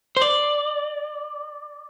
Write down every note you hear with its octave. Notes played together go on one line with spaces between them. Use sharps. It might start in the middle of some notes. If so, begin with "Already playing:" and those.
C5
D5